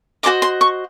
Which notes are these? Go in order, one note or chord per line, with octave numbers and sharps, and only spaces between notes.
F#4 A4 C5 D#5 D6
C6
C#6